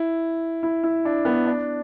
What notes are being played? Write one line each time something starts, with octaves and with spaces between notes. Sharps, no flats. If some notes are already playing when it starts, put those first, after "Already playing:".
Already playing: E4
E4
E4
D4
B3
D4